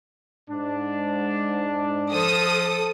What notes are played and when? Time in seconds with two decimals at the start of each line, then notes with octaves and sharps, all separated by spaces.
0.50 G#2 D4
2.12 F3 A4 D#6